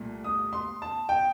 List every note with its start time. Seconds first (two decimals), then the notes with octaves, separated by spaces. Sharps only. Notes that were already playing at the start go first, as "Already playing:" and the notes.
Already playing: C2 A#2 A3
0.24 D#6
0.53 C6
0.82 A5
1.09 G5